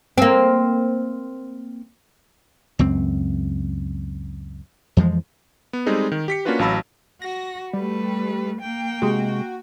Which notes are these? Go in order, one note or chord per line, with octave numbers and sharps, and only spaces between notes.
A#3 C4
C#2 F#2 C4
F2 E3 F3 G#3
B3
G3 G#3 C4 D#4 G#4 A4
D#3
G4 B6 C#7
A#3 C#4 D4 F4 F#4 B4
A1 F#3 F5 A5 B5 E6
F#4 A#6
G3 A3 B4
A#3 G5
C3 G#3 F#4